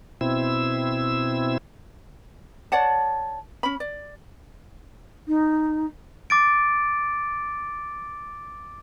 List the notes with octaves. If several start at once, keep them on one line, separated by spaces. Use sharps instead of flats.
B2 C4 E4 E6
C#5 D5 F#5 A5
C#4 B5
D5
D#4
D6 A6 D7